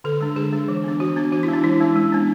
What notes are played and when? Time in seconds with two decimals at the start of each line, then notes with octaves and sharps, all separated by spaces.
0.04 D3 A4
0.21 G#3 D4
0.36 D3 G#4
0.53 G#3 D4
0.68 E3
0.84 B3 D4
1.00 E3 F#4
1.16 B3 D4
1.32 E3 F#4
1.43 E4
1.48 G#3 C#4
1.53 D4
1.64 E3 E4
1.80 G#3 C#4
1.96 G#3
2.12 B3 D4